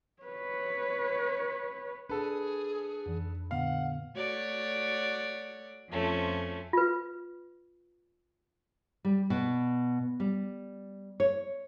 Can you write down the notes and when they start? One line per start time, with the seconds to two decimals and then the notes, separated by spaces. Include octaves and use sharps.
0.22 B4 C#5
2.09 D4 G#4 A4 B4
3.06 F2 E3
3.51 A#2 D3 B3 F5 F#5
4.15 A3 F#4 C#5 D5
5.89 F2 F3 A3 C#4
6.73 F4 B4
9.05 G3
9.30 B2
10.20 G3
11.20 C#5